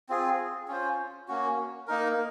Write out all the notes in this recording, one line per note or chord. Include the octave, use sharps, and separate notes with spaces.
C4 F4 G#4
C#4 F4 C5
A#3 C#4 F#4
A#3 D#4 A#4